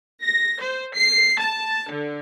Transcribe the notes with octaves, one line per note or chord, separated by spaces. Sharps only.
A#6
C5
C7
A5
D3